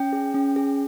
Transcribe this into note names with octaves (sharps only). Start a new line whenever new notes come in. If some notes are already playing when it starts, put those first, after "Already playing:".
Already playing: C#4 G5
G#4
C#4
G#4